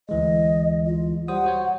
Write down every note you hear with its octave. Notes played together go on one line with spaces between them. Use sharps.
D2 E3 G#3 D#5
F4
G3 C5 F#5 D#6
F#4 C5 C#5